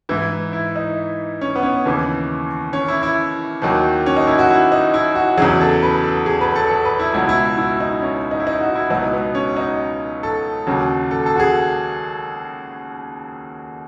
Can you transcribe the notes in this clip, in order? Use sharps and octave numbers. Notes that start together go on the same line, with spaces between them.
G#2 E3 E4
E4
D#4
C#4
B3
C#4
D#2 C#3 E3
C#4
E4
E4
D#2 D#3 F#3
C#4
D#4
E4
F#4
E4
D#4
E4
F#4
E2 C#3 F#3 G#4
A4
B4
A4
G#4
B4
A4
A4
B4
E4
C#2 B2 F#3 E4
E4
F#4
E4
D#4
C#4
D#4
E4
D#4
F#4
E4
C#2 B2 F#3 D#4
B3
C#4
D#4
A4
D#2 C#3 F#3
A4
A4
F#4
G#4